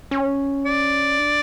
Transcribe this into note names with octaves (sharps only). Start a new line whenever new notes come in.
C#4
D5
D4